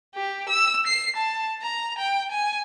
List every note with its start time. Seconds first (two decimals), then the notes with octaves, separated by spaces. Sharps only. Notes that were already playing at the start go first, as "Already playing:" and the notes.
0.15 G4
0.49 E6
0.87 C7
1.16 A5
1.62 A#5
1.98 G5
2.32 G#5